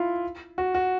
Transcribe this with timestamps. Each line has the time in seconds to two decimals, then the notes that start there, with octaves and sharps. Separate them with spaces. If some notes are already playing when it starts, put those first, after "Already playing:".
Already playing: E4 F4
0.58 F#4
0.75 F#4